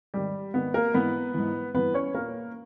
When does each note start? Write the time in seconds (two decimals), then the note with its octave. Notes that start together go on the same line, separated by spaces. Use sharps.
0.14 G#2 D#3 G3 G4
0.54 G#2 D#3 B3
0.74 A#3 A#4
0.94 G#2 E3 B3 B4
1.34 G#2 E3
1.74 G2 E3 B3 B4
1.94 C#4 C#5
2.14 A#2 A#3 A#4